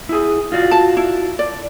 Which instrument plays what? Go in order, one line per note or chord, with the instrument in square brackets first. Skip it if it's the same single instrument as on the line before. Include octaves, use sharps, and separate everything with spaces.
[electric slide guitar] E4 G#4
F4 F#4 D5
[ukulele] A5
E4
D5